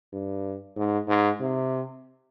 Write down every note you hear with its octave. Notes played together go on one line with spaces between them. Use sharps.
G2
G#2
G#2
C3